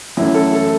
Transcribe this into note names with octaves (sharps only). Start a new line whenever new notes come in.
F#2 E3 A3 C#4 E4
A4
A4